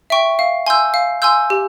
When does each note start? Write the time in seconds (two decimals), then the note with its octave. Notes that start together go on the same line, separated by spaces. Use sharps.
0.10 E5 G5 C#6
0.39 F5
0.67 G#5 C6 E6 G6
0.94 F5
1.22 G#5 C6 E6 G6
1.50 G4